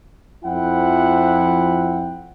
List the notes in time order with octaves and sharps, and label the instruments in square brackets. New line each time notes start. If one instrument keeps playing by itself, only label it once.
[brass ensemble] F2 F3 E4 F#5 G5